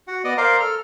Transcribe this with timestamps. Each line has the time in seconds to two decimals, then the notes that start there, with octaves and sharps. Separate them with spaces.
0.08 F#4 F#5
0.24 B3 D5 D#5
0.38 A#4 C5 D5 F5 A#5 C6
0.60 A4 F6